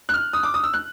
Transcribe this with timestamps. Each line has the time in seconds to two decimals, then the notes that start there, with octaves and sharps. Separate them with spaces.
0.09 F#6
0.14 F6
0.33 D#6
0.43 D6
0.54 D#6
0.64 E6
0.74 F#6